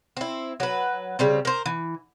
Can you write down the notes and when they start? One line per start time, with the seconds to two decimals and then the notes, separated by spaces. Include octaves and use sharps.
0.17 C4 E4
0.60 F#3 B4
1.19 C#3 G3 C4
1.45 A#4 C5
1.66 E3